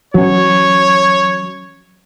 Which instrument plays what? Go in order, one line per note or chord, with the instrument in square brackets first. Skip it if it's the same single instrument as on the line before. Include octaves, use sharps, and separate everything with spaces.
[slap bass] E3 C#4 [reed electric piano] F#3 [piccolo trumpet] C#5